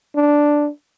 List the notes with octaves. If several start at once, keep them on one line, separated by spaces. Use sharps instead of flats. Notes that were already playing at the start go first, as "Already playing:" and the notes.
D4